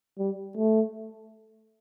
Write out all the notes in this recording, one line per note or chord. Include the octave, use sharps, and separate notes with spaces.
G3
A3